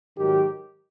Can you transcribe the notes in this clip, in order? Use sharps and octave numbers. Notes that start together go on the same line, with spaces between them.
G#2 D#3 F#3 G4